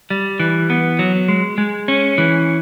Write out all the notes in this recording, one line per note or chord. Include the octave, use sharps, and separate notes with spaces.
G3
E3
B3
F#3
G#3
G#3
C#4
E3